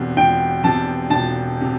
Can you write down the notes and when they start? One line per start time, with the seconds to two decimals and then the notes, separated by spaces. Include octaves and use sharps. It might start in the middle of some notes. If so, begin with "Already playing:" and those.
Already playing: E1 E2 C3
0.17 E1 G5
0.63 E2 C3 A5
1.10 E1 A5
1.61 C3